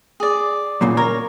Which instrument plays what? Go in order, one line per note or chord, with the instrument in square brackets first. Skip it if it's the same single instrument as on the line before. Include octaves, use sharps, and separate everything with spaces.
[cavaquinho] G#4 D5
[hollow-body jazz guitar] F#2 A#2 C#3
[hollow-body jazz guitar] A#4 [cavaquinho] C#5